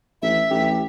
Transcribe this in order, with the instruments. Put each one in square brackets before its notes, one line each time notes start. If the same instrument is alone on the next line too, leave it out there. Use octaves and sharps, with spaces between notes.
[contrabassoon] A1 [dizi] E5
[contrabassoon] A1 [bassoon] G4